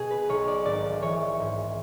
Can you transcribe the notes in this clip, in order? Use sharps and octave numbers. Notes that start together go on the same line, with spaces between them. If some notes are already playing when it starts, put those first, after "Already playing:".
Already playing: B2 G#4
B4
B1 C#5
D5
G#1 D5
E3 C#5
G#2